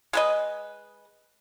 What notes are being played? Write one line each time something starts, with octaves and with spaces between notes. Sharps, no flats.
G#3 B4 D#5